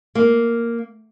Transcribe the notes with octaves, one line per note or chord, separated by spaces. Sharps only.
A#3